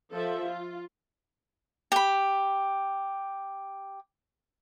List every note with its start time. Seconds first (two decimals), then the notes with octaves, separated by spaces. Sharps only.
0.13 F3 A4 E5
0.47 F4
1.92 G4 B5